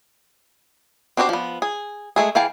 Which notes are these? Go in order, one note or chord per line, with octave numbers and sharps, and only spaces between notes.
C4 D4 F#4 G4 C5
F3 B3
G#4
G#3 A3 G#4
E3 G#4 F5 G5 A5